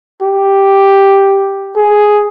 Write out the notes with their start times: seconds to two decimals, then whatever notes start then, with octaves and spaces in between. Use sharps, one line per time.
0.22 G4
1.76 G#4